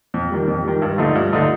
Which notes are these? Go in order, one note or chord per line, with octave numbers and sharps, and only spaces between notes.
F2
D#3 G3
F2
D#3 G3
G2
D3 F3 A3 D#4
G2
D3 F3 A3 D#4